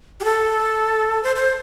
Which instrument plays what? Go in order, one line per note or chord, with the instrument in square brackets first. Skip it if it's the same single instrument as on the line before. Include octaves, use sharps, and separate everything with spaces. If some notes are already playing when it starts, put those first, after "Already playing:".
[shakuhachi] G4
A4
C5
C5